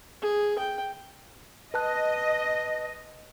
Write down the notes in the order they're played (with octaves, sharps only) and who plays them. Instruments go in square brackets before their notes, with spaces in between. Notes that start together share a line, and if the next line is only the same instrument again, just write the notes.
[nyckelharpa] G#4
G5
[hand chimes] B4 A5 F#6 [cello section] D#5